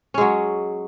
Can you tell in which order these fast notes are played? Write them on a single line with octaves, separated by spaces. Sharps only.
C#4 G#3 F#3